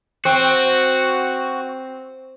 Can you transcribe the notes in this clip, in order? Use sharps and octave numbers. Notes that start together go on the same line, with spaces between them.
C4 F#4